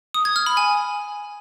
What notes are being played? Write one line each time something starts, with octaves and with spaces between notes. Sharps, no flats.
D#6
G#6
F6
B5
G#5